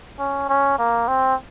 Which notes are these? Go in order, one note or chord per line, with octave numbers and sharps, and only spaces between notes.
C#4
C#4
A#3
C4